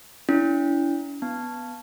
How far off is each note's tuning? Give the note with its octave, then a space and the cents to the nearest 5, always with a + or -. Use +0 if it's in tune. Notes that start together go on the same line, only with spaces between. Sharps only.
C#4 +45 E4 +0
B3 +0 A5 +0